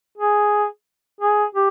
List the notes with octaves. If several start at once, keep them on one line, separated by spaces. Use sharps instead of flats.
G#4
G#4
G4